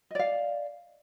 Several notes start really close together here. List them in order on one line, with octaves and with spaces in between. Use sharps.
D#5 D5 F5